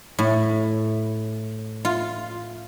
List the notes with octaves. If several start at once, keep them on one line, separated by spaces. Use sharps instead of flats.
A2
F4